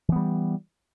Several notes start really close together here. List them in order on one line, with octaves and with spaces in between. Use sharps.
E3 B3 G3